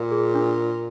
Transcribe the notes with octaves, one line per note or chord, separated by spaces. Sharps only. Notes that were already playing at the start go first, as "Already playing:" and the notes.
Already playing: A#2
G#4
D4